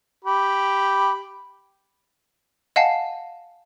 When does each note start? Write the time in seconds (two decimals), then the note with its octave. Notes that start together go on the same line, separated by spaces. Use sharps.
0.25 G4 B5
2.76 D#5 F5 F#5 G#5 A5 C7